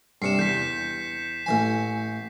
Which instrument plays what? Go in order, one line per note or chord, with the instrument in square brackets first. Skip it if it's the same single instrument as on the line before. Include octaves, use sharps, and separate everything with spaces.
[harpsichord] G2 C3 [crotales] C7 C#7 E7
[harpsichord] E2 [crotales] G6 B6
[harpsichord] A1 E3 G#5